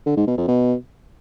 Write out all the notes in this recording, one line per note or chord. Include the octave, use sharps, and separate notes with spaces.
D3
G#2
B2
F2
B2